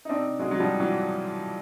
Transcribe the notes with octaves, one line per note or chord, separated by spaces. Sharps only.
D#4
C4 D4
F#3 G#3
F#3
F3 G3
E3 F#3